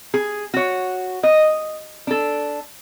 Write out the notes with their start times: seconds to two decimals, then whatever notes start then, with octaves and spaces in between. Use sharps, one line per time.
0.14 G#4
0.54 F#4 C#5
1.23 D#5
2.07 D4 A4